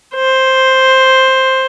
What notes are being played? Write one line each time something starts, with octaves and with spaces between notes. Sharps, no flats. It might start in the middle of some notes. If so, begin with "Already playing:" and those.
C5